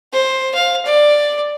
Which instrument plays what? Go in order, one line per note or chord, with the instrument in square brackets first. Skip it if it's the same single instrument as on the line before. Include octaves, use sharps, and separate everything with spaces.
[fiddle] C5
F5
D5